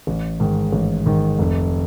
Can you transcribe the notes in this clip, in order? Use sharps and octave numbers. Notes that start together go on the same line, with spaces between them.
A1
G#2 D#3
A1
G#2 D#3
F1